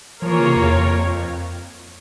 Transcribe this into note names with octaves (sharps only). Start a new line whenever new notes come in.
F3 A#3 F4 A#4 C#5
E3
C#3
C3
E2
F2